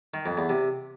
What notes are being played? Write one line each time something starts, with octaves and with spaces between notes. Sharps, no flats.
D#3
F2
E2
C3